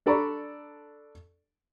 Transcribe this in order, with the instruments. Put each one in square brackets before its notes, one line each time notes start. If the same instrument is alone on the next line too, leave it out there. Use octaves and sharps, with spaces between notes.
[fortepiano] D4 A4 D5 A#5 B5 C#6